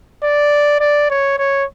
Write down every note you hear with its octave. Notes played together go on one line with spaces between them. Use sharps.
D5
D5
C#5
C#5